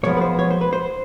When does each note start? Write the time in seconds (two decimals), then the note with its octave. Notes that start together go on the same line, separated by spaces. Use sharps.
0.03 B1 A2 F3 G#3 B3 C#5
0.17 B4
0.21 C5
0.39 C#5
0.50 C5
0.61 B4
0.73 C5